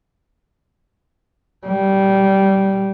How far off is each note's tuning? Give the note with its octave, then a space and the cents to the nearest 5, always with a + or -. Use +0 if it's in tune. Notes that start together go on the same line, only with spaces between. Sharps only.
G3 -15